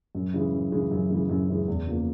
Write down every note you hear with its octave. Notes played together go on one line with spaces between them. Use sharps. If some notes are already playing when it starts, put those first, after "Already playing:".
F#2
C#3 E3 G#3
F#2
C#3 E3 G#3
F#2
C#3 E3 G#3
F#2
C#3 E3 G#3
E2
C#3 F3 A#3